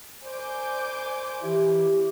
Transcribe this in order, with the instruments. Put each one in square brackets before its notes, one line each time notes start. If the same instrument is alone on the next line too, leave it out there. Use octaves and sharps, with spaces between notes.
[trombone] C5 [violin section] G#5 D6 G6
[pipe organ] E3 E4 [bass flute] G4